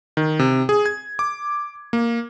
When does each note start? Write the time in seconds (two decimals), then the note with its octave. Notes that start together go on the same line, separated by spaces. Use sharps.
0.17 D#3
0.39 C3
0.69 G#4
0.86 G#6
1.19 D6
1.93 A#3